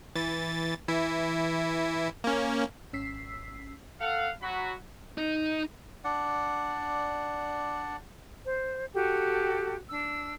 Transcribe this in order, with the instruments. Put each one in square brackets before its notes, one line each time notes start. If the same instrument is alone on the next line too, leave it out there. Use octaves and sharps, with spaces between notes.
[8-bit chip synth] E3 A6
E3 E4
A#3 C#4
[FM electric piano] G#1 C#4 E6 B6 C7
[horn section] A4 F5 F#5
F#3 F#4 B5
[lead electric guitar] D#4
[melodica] D4 D5 F#5
[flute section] C5
F#4 G4 A4 G5
D4 E6